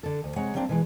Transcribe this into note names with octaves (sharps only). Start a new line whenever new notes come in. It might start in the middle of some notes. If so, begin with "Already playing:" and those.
D3 A4
D2
C3 G#3 C#5 F#5 A#5
F#3 G3 A#3 C4 D4
B2 E3 G#3